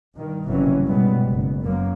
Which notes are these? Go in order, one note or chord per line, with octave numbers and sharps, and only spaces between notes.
G2 D#3
F#1 G2 C3 E3 F#3 C#4
B2 G3 G#3 B3
F#1
F#2 A#3